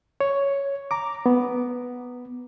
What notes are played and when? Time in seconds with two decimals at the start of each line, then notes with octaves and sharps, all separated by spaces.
0.21 C#5
0.91 A#5 D6
1.26 B3